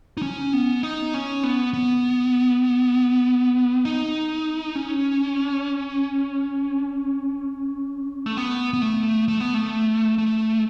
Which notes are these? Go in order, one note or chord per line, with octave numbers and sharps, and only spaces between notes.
D#4
C#4
B3
D#4
C#4
B3
B3
D#4
C#4
A3
B3
B3
A3
A3
B3
A3
A3